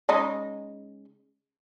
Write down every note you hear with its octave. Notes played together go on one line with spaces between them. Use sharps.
C#3 G#3 D#4